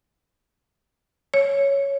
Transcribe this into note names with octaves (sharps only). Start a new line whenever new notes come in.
C#5